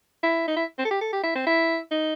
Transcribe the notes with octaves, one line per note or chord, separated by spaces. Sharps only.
E4
D#4
E4
C4
A4
G4
A4
G4
E4
C4
E4
D#4